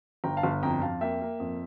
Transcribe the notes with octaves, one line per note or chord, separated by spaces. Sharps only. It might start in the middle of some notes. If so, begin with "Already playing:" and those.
G1 G5 A#5
F5 A5
G1
F2 G5 A#5
F2 F5 A5
A#3 E5 G5
A#3
F2